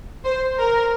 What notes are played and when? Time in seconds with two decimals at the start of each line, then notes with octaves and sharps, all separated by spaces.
0.25 C5
0.58 A#4